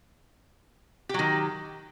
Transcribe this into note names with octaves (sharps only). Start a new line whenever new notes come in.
D#3 F#3 G4